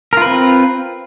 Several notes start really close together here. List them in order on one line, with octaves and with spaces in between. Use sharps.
A#4 F4 B4 C4